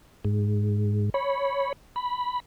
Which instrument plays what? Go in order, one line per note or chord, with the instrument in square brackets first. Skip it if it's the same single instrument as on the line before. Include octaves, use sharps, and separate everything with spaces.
[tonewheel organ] G#2
C#5 B5
B5